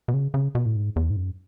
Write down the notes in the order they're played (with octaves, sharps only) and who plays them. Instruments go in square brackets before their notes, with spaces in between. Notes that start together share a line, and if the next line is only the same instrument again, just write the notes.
[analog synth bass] B2
C#3
C#3
B2
A2
G#2
E2
G#2
F#2